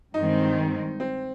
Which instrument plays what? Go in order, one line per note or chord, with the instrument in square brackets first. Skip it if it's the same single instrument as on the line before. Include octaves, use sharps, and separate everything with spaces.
[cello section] G2 D#3 G#3 C4 [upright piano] D#4
[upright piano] C4